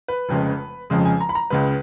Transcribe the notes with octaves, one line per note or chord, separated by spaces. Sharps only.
B4
F1 F2 C#3 G#3
F1 F2 C#3 G#3
G#5
A#5
B5
A#5
C#2 C#3 G#3 B4